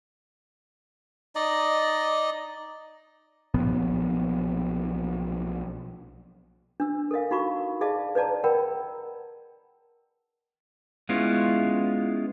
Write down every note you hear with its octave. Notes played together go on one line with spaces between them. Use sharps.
D#4 D5 D#5
B1 A#2 F3 B3
D4 E6
A4 A#4 D#5 F5
D#4 F#4 F5 B5 C#6
G#4 D5 D#5 F5 A5
B4 C#5 D5 A5 A#5
A#4 C#5 F#5 G5 A#5 B5
G#3 B3 C#4 E4 F4